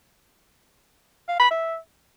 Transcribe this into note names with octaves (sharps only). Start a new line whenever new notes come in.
F5
B5
E5